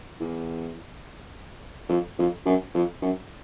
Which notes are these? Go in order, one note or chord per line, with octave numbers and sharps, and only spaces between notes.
E2
F2
F2
F#2
F2
F#2